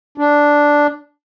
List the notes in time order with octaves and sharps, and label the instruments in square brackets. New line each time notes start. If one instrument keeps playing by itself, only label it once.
[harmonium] D4